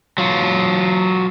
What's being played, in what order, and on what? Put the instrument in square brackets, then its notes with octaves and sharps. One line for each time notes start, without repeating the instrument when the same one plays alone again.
[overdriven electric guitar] F#3 F4